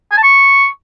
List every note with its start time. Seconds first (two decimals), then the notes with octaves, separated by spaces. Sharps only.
0.12 G#5
0.17 A5
0.23 C#6